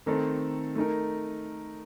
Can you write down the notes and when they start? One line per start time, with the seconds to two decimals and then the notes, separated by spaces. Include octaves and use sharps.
0.06 D#3 A3 C4 D#4 A4
0.75 A3 D#4 A#4